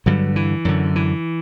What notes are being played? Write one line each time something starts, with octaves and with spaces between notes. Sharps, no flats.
G2 D3 F#3
E3
F#2 D3
E3